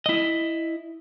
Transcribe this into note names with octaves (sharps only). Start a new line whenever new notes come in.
E4 D#5